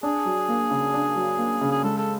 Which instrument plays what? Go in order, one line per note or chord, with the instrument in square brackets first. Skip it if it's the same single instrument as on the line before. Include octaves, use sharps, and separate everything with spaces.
[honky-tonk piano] D4 [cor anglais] G#4
[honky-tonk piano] F#3
A#3
C#3
D4
F#3
A#3
C#3
[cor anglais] G#4
[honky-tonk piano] G#3 [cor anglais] A4
[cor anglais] A4